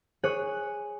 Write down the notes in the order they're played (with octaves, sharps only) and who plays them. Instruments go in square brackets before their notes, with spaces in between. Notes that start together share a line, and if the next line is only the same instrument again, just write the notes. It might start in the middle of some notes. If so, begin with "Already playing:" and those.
[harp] G#4 C#5 F#6 D#7